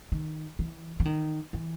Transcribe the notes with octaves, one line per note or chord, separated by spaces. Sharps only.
D#3
E3
E3
D#3
E3